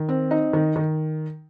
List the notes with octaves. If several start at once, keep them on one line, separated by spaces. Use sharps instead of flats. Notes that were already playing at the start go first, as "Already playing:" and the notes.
Already playing: D#3
C4
D#4
D#3
D#3